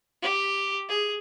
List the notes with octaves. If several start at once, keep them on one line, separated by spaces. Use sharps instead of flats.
G4
G#4